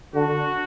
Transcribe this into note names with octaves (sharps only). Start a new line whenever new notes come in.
D3 F#4